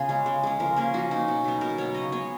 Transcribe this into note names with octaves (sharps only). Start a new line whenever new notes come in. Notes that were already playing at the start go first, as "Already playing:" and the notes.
Already playing: C#3 B3 F4 G#4
G#3 C#4
C#3
G#3 C#4
F3 A#4
A#3 C#4 G#4
F3 F#4
A#3 C#4 D#4
B2
F#3 B3 D#4
B2 A#4
F#3 B3 C#5
C#3 D#5
G#3 B3 C#5